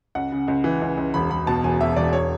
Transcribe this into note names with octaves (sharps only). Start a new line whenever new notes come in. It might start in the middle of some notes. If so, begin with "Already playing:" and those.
C#2 F#5
C#3
C#2
E3
C#2
C#2
E1 B5
E1 B5
B2 A5
E1 G#5
E2 E5
E1 D5
C#5